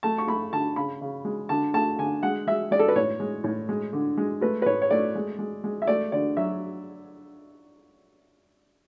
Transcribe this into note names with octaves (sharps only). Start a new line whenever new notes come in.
A3 A5
C#6
A3 B5
D3 A5
C#3 B5
C#3
G#3
D3 A5
A3 A5
D3 G#5
G#3 F#5
G#3 E5
G#3 D5
A4
B4
A2 C#5
G#3
A2
G#3
D3
G#3
A3 B4
B4
A2 C#5
C#5
A3 D5
G#3
G#3
G#3
E5
A3 D5
D3 D5
F#3 E5